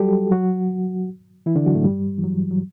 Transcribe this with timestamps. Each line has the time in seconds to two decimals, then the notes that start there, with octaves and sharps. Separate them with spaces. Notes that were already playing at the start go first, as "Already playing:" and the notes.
Already playing: F#3 G3 F#4 G4 A4
0.31 F#3 F#4
1.46 E3 E4
1.56 D3 D4
1.66 F#3 F#4
1.75 A2 A3
1.84 G2 G3
2.18 E3
2.24 F#3
2.51 F#3